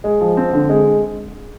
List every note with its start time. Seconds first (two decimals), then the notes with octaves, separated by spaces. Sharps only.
0.04 G#3
0.21 F3
0.37 C4
0.53 D3
0.69 G#3